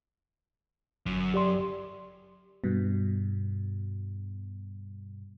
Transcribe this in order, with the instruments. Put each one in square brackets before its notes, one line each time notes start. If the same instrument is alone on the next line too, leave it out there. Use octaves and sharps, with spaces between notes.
[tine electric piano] G1 [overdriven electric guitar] F#2
[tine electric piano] G4 D5 C6
[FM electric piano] G2 B2